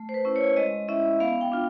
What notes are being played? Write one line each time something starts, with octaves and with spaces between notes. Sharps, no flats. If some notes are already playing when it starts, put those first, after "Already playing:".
Already playing: A3
C5
B4
C#4 E4
C#5
G#3 D#5
C#4 E4 E5
B3 F5
G5
D4 F4